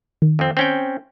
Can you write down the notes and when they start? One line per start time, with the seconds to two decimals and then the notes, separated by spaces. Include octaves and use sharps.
0.22 D#3
0.39 F2 C4
0.57 C4 C#4 G5